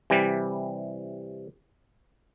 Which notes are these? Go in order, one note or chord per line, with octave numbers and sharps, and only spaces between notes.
C3 E3 G3